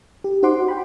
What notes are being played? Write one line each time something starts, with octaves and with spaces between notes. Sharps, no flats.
G4
D#4 F#4 C5 F#5 C6 D6
G5 B5